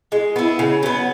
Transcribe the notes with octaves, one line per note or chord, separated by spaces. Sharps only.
G#3
B3 E4
C#3
F#3 B3